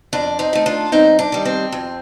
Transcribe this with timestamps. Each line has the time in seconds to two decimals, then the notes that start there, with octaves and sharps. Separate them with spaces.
0.13 F2 D4
0.39 C4 D#4
0.53 D#3 A3
0.66 D4 F4
0.92 G2 C4 D#4
1.19 D4
1.32 D#3 G3
1.45 C4
1.72 F2